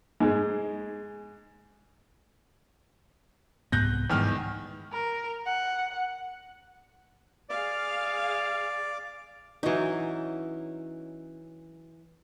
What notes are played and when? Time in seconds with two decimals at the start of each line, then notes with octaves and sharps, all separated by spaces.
0.20 G#2 G#3
3.72 C2 G#2 B3 F#6 G6 A#6
4.10 E2 G#2 D#3 E3 G3 F6
4.92 A#4
5.45 F#5
7.49 G#4 D5 F5
9.63 E3 F#3 C#4 D#4